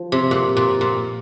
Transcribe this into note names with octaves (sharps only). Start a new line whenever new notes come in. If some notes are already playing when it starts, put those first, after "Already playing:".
Already playing: F3
C3
A#2
A#2
A#2